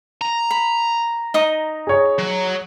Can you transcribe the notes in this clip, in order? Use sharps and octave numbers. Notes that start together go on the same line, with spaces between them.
A#5
B5
D#4 D#6
G#4 C#5
F#3